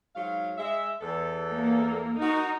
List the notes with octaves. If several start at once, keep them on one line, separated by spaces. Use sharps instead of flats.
G#2 F#3 F5
G#3 E5
E2 A4
A#3
D#4 F#4 A#4